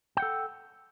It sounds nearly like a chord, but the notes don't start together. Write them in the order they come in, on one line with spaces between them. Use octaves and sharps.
G5 F#5 A4